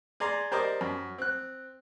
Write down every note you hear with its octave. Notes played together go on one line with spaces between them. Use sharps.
G#4 D5 A#5 C6
G4 A#4 C5 D5 D#5
F#2
C4 F#6